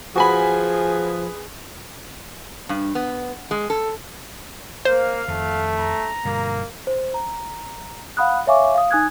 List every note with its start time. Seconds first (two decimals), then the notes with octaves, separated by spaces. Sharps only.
0.16 F3 F#4 G#4 B4 G#5 B5
2.69 G2
2.95 B3
3.51 G#3
3.70 A4
4.85 A#3 C5 F5
5.28 F2 D#3 A3
5.80 A#5
6.25 G2 B2 D3 A#3
6.87 C5
7.14 A#5
8.17 F5 F#5 B5 D#6 F#6
8.47 C#5 E5 F5 G#5 C#6 D6
8.75 F5 D#6
8.91 D#4 G#5 D#6 F#6 G#6